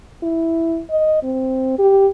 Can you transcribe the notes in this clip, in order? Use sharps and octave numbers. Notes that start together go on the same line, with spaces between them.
E4
D#5
C4
G4